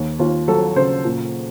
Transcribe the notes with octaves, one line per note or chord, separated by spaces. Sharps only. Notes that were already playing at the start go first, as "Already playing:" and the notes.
Already playing: D#2
D#2 F4
F#3 A4
C#3 C5
A#2